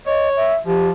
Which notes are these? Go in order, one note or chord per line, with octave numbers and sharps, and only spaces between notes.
C#5 D#5
E5
F3 G4